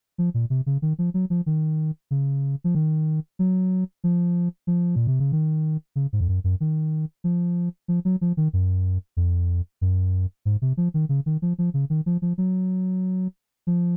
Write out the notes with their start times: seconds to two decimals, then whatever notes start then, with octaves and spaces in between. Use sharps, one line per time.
0.18 F3
0.34 A#2
0.50 C3
0.66 C#3
0.82 D#3
0.99 F3
1.14 F#3
1.30 F3
1.46 D#3
2.11 C#3
2.64 F3
2.75 D#3
3.39 F#3
4.04 F3
4.67 F3
4.96 A#2
5.07 C3
5.20 C#3
5.32 D#3
5.96 C#3
6.13 G#2
6.21 F2
6.28 F#2
6.44 F#2
6.60 D#3
7.24 F3
7.88 F3
8.05 F#3
8.21 F3
8.37 D#3
8.53 F#2
9.17 F2
9.81 F#2
10.45 G#2
10.62 C3
10.77 F3
10.94 D#3
11.09 C#3
11.26 D#3
11.42 F3
11.58 F3
11.74 C#3
11.90 D#3
12.06 F3
12.22 F3
12.38 F#3
13.67 F3